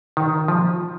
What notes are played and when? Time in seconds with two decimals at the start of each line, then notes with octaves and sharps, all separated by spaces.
0.17 D#3
0.48 F3